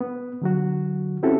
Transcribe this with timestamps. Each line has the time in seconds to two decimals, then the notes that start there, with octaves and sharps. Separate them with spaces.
0.01 B3
0.42 D3 F#3 F#4
1.23 C4 C#4 E4 F#4 G4 A4